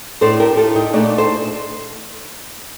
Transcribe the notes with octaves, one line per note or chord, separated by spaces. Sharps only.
A2 A3 D4 A4 C5
G4 A#4
F4 A4
D#4 G4
A#2 A3 D4 D#4
A4 C5